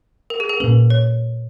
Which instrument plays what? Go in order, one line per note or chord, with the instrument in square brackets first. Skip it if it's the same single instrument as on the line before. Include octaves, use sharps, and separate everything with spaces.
[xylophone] A#4
G#4
A#4
[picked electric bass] A#2 A#3 C#4 [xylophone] B4
[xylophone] C#5